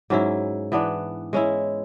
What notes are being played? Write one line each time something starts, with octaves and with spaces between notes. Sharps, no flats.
G#2 F#3 C#4 E4
E3 B3 D4
G#3 C#4 E4